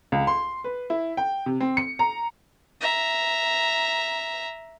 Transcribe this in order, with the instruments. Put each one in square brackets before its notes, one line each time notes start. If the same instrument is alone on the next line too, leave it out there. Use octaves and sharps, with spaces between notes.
[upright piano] C#2
C6
B4
E4
G5
C3
C4
C#7
A#5
[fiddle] E5 A#5